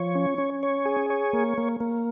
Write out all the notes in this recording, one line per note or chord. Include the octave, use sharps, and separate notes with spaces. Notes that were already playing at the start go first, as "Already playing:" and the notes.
Already playing: F3 C#5
C#4
C#4
C#5
G#4
C#5
A#3
A#3
A#3